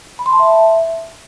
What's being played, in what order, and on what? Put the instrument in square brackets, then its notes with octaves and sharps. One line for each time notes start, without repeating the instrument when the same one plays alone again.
[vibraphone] B5
C6
A5
E5